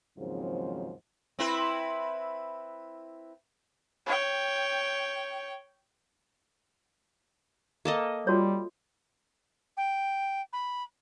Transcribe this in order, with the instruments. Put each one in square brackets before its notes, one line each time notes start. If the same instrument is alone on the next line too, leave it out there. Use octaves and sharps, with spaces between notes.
[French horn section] D#2 G#2 C#3 F3 F#3 C4
[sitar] C4 E4 B4
[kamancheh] C#5 G5
[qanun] A#3 A4 D#5
[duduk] G3 [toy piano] F4 F#4 C#5
[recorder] G5
B5